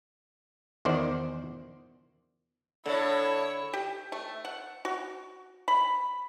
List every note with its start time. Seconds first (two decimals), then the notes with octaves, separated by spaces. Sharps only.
0.85 E2 D#3 C5 D5
2.86 A2 D3 E4 C#5
3.73 G4
4.12 A3
4.45 F#5
4.85 F#4
5.68 B5